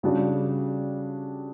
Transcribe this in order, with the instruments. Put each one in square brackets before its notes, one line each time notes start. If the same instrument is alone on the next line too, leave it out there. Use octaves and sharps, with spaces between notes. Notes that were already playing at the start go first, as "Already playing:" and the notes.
[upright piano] C#3 G3 D4 F#4